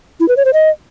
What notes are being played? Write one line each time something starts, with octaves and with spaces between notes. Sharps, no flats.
E4
B4
C#5
C5
D#5